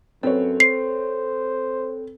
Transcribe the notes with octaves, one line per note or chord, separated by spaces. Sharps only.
F#2 C4 A4 B4 C#5
C5 C7